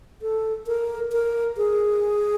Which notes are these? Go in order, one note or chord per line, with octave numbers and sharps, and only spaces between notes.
A4
A#4
A#4
G#4